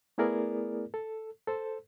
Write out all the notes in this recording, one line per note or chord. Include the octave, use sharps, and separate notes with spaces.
A3 B3 E4 G#4 A#4 D5
A4
A4 C5